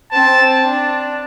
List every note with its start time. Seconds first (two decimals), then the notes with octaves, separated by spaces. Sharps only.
0.12 C4 A5
0.66 D4